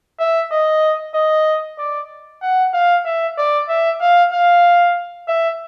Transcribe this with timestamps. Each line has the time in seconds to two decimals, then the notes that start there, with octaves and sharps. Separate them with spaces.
0.19 E5
0.52 D#5
1.15 D#5
1.78 D5
2.42 F#5
2.74 F5
3.05 E5
3.37 D5
3.68 E5
4.01 F5
4.33 F5
5.28 E5